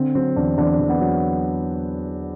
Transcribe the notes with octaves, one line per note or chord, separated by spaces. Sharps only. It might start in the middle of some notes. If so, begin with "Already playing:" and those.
Already playing: D3 C4
F#3 C4
E2 D4
E2 D4
E2
B3
F#3